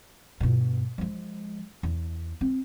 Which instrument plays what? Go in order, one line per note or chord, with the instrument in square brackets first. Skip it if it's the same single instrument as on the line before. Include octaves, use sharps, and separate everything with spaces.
[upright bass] G2 B2
F3 G#3
E2
C4